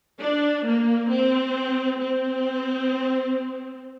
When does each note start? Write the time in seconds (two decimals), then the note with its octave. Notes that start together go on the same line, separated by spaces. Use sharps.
0.22 D4
0.67 A#3
1.11 C4
2.01 C4